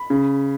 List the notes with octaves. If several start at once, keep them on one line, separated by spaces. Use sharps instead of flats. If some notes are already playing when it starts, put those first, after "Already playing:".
Already playing: B5
C#3